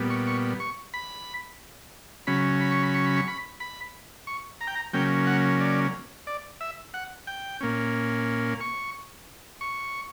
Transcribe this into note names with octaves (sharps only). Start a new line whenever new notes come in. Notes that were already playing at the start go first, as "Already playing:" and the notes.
Already playing: A#2 G3 B3
C#6
C#6
C#6
B5
C#3 F#3 C#4 B5
B5
C#6
B5
C#6
B5
C#6
B5
B5
C#6
A#5
G5
A#5
C#3 F#3 A#3 C#4 G5
F#5
D5
D5
E5
F#5
G5
A#2 A#3 C#4
C#6
C#6